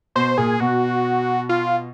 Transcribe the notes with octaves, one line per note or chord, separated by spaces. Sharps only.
B2 C5
A#2 G#4
B2 F#4
F4